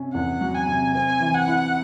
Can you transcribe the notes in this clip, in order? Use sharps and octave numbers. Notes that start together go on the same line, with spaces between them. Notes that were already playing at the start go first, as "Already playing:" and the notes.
Already playing: C3 C#4
E2 F#5
F#3
G#5
C3
C4 G#5
E3
F#5
E4